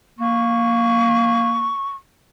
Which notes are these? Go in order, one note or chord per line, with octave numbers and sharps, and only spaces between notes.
A#3 C#6